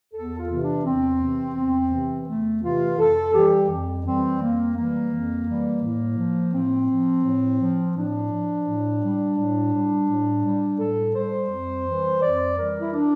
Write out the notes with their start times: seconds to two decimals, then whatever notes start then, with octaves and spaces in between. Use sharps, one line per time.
0.14 E2 A4
0.38 F4
0.50 C3 E3
0.62 D4
0.85 E2 C4
1.21 C3 E3
1.56 E2
1.92 C3 E3
2.27 E2 A3
2.62 C3 E3 F4
2.98 F2 A4
3.33 E3 G4
3.39 G3
3.70 F2
4.05 E3 G3 C4
4.40 F2 A#3
4.76 E3 G3 A#3
5.12 F2
5.47 E3 G3
5.82 A2
6.17 F3
6.53 A2 C4
6.88 F3
7.24 A2
7.60 F3
7.96 A2 D4
8.31 F3
8.66 A2
9.02 G3
9.38 A2
9.74 G3
10.09 A2
10.44 G3
10.79 A2 A4
11.15 G3 C5
11.50 F2
11.86 E3 G3
12.22 F2 D5
12.57 E3 G3 A#4
12.81 E4
12.93 D4